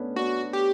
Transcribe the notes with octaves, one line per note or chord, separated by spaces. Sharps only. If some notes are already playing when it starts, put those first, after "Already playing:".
Already playing: A3 B3 C#4 D4
B3 D4 F#4
G4